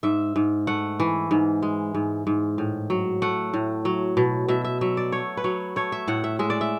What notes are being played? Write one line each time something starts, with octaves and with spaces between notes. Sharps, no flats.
G#2 E5
G#2
A3 F#5
E3
G#2
G#3
G#2
G#2
A2
F#3
A3 F#5
A2
F#3
B2
B2 E5
E5
F#3 E5
D5
A3 C#5
B4
F#3 C#5
A3 C#5
E5
A2 F#5
E5
G#3 E5
D5
E5